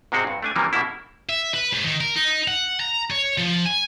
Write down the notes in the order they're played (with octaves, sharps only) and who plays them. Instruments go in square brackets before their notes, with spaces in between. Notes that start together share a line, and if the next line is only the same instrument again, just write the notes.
[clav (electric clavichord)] G#2 C3 G#3 C4 F#4
G2
A3 D4 G#5
C3 D#3 E3 F#3 G3 A#3
B2 G3 A#3 E4
[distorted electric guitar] E5
B4
G#2
D#3
A#4
D#4
F#5
A#5
C#5
F3
G#5